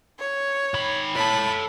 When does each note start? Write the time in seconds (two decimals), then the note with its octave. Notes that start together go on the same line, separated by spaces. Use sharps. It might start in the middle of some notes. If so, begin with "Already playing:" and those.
0.19 C#5
0.74 D#3 B5
1.15 A4 C#5 A5 B5